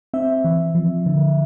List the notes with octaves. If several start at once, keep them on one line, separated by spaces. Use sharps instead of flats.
C4 E5
E3
F3
D3